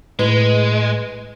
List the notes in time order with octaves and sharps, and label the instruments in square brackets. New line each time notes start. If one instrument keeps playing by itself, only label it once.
[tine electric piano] A2 [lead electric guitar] G#3 [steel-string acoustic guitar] B4